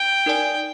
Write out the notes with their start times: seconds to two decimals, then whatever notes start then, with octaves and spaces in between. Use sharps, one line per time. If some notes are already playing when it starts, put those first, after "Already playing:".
Already playing: G5
0.26 D#4 A#4 D5 G#5